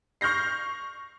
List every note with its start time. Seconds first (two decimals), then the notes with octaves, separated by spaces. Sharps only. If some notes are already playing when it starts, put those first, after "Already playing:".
0.21 C#6 F6 G6 A#6 C7